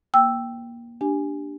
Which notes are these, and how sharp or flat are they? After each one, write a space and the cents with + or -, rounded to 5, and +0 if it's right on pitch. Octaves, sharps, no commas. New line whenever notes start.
A#3 +20 G5 +0 E6 +0
D4 +0 G4 +0 G#5 +0